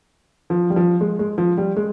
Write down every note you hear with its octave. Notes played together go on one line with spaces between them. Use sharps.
F3
G3
F3
G#3
G#3
F3
G3
G#3